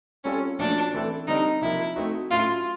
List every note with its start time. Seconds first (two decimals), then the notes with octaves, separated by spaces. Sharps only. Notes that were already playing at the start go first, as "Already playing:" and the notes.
0.24 G3 C4 C#4 F4 A4 C#5
0.59 A#2 F3 A3 C#4 D4 F#4
0.94 E3 A3 C4 E4 A4
1.27 D3 G3 C4 D#4
1.62 C3 F3 A#3 E4
1.96 A3 C4 D#4 F#4
2.31 A2 F#3 A3 C#4 E4 F4